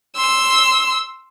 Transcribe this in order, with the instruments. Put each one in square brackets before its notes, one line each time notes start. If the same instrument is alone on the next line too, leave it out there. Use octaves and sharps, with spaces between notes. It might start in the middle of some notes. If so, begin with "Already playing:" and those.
[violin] C6 E6